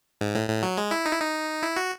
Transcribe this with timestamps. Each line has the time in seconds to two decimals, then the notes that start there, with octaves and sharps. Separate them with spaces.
0.21 G#2
0.35 A2
0.49 A2
0.63 F#3
0.77 G#3
0.91 E4
1.06 D#4
1.12 E4
1.20 D#4
1.63 E4
1.77 F#4